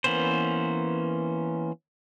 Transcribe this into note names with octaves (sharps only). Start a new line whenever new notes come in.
E3 A#3 B3 C#4 C5